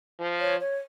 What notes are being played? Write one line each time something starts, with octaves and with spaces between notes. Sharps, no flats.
F3
C#5
C#5